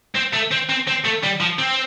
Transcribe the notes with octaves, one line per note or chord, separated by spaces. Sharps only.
C4
A3
C4
C4
C4
A3
G3
F3
C4